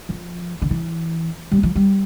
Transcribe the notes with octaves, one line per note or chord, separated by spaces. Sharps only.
F3
D3
E3
G3
F3
G3